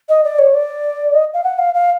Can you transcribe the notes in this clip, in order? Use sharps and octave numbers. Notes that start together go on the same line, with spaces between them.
D#5
D5
C#5
D5
D#5
F5
F#5
F5
F5